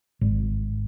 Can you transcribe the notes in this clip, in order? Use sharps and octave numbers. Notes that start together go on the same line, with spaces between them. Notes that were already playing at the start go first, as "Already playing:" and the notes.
G#1